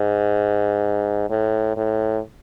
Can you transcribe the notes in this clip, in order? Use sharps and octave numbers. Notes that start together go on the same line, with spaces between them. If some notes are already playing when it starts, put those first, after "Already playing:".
Already playing: G#2
A2
A2